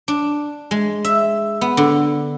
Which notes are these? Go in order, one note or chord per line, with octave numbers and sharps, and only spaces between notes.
D4
G#3
E5
B3
D3